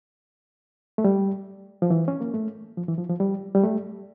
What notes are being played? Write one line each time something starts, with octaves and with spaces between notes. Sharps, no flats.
A3
G3
F3
E3
C#4
A#3
A3
F3
E3
F3
F3
G3
G3
A3